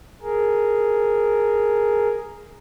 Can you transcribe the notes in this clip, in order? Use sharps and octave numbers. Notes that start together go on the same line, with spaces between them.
G#4 A#4